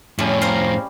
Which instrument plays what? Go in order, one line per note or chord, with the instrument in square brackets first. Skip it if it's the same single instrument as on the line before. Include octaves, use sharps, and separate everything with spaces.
[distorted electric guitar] F2 A2 [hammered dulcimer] G3 C#4 [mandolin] A3
[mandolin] C5 F5 A#5